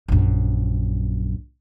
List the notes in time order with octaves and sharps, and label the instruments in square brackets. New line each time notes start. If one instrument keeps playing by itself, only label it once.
[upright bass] A#1 F#2